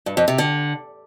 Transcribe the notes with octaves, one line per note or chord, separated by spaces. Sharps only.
G2
F2
C3
D3